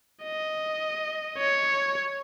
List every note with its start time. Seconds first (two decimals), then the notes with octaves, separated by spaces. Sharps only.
0.24 D#5
1.38 C#5